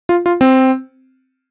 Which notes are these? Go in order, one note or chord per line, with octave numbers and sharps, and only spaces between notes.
F4
F4
C4